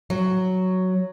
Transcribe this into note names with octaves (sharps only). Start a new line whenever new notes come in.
F#3